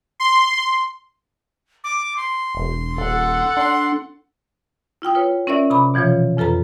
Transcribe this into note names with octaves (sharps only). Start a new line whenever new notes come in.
C6
D6
C6
E1
D#1 A4 F#5
D4 C6
E4 F4 G5 D#6
F4 B4 C#5
C#4 E4 A#4 D5 E5
C3 A#5 B5 D6
B2 E3 F3 F4 C#5
F2 F4 A4 B4 A#5